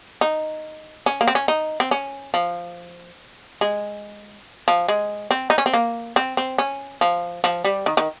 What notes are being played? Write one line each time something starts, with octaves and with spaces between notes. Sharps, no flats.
D#4
C#4
A#3
C4
C#4
D#4
C4
C#4
F3
G#3
F3
G#3
C4
D#4
C#4
C4
A#3
C4
C4
C#4
F3
F3
G3
D#3
D#3